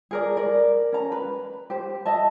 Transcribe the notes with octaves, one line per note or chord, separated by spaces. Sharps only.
G#4 A#4 D5
A#4 D5
C#4 A#5
B4
G4 C5
D#5 E5 A5